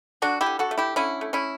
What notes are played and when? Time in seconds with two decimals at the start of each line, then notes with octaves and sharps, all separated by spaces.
0.22 D3 D4 F#4
0.41 E4 G4
0.46 D3
0.59 F#4 A4
0.71 A3
0.78 E4 G4
0.96 D3 C#4 E4
1.21 A3
1.33 C#4 E4